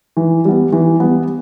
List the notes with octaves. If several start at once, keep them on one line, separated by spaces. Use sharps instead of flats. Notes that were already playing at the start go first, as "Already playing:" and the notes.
E3
G3 B3
E3
G3 B3